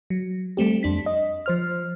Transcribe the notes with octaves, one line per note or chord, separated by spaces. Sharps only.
F#3
G3 A3 C4 G4
F2 D4 B6
D#5
F3 C5 F6